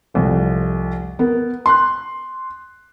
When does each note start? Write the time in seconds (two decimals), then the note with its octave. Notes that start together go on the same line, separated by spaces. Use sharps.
0.14 F1 C2 F3
1.19 B3 A#4
1.66 C6 F#6